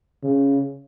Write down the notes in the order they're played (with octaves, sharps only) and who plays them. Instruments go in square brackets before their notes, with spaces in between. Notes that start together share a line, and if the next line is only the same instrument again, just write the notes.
[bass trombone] C#3